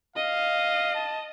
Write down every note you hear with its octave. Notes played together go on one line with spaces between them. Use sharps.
D#5 F5
A5